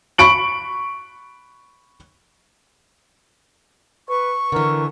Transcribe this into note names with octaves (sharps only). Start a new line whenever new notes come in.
B5 C#6 D7 F#7
B4 C#6
D3 E3 A#4